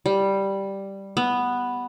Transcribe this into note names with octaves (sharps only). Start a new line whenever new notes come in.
G3
B3